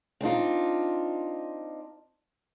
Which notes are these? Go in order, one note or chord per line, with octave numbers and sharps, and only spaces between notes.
C4 D4 D#4 F4